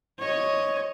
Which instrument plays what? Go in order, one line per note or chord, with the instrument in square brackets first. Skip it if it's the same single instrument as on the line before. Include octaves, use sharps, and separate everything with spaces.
[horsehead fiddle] C#5 D#5